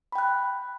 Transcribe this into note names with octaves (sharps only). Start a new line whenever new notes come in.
G5 B5 F#6